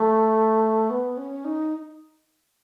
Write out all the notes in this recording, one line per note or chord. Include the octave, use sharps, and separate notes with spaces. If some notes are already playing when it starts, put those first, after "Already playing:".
Already playing: A3
B3
C#4
D#4